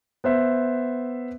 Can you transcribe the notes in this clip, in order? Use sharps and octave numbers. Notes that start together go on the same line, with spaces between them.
B3 C5 E5